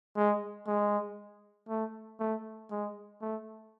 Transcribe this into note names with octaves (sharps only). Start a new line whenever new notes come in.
G#3
G#3
A3
A3
G#3
A3